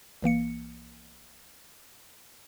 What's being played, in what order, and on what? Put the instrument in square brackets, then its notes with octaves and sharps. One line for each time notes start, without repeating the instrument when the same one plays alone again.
[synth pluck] B1 E3 A#3 C#7